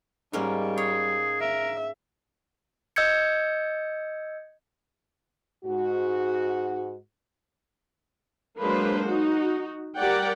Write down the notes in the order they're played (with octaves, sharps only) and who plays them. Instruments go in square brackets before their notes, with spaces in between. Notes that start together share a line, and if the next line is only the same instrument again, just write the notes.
[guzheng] G#2 A#3 C#4 [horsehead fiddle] G3
[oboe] G#4 [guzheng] C#5
[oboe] A#4 [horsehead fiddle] E5
[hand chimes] D#5 E6 G6 G#6 C#7
[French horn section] G#2 F#4
[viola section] F#3 G#3 A#3 D4 B4 C5
D#4 F#4
G3 G4 A#4 D5 F#5 G5